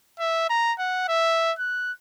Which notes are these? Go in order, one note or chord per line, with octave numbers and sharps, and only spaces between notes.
E5
A#5
F#5
E5
F#6